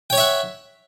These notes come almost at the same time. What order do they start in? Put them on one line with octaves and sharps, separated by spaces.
G5 C#5 C#6 E5 F#5